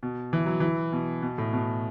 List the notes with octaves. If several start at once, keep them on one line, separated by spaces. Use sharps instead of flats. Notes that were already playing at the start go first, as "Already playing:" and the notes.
B2
E3
F#3
E3
B2
B2
A2
B2